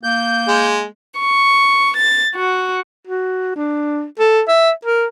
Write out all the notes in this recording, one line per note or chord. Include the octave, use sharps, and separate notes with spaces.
A#3 G6
G#3
C#6
A6
F#4
F#4
D4
A4
E5
A#4